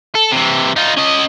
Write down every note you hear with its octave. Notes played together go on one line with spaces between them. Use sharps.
A4
C3 E3
D#4 F4
C#4 D#5